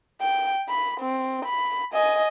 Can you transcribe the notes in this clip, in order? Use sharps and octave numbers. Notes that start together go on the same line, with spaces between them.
G5
B5
C4
B5
D#5 G#5